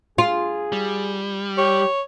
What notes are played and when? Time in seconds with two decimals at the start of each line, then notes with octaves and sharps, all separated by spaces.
0.18 F4 G#4
0.73 G3
1.57 G4 C#5